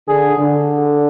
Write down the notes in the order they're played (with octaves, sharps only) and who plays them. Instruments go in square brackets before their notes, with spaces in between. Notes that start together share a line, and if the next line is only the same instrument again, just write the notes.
[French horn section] D3 [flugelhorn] G#4
[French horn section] D3